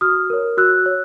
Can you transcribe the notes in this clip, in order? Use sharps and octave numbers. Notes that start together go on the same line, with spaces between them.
F#4 D#6 F6
A#4 C#5
F#4 E6 F#6
C#5